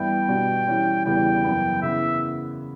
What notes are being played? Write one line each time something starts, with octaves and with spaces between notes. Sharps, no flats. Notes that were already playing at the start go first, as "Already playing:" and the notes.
Already playing: G2 E3 B3 E4 G5
B2 G3 B3 D4 F#4
E3 G3 C#4
E2 C#3 E3 G3 B3 G5
F#2 E3 B3
C#3 E3 B3 E5